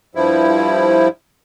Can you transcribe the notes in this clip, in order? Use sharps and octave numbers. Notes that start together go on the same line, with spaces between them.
G2 F3 E4